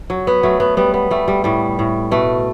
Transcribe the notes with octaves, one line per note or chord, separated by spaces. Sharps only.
F#3
B3
F#3 A3
B3
G3 B3
B3
G3 A3
G3
A2 G3
A2
B2 A3